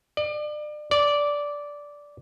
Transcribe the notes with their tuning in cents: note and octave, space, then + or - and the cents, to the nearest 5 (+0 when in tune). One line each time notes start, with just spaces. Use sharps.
D5 +35
D5 -10